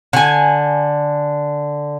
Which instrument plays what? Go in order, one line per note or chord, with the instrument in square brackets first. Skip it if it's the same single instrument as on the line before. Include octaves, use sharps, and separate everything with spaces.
[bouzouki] D3 G#5